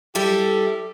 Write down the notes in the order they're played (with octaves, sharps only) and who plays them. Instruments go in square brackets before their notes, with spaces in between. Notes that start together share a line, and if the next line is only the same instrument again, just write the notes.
[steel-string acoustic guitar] G3 E4 A4 [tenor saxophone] G4